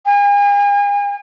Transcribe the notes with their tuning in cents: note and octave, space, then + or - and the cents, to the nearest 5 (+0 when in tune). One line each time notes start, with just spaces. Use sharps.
G#5 -40